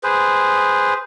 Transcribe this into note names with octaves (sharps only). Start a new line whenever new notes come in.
G#4 B4 C5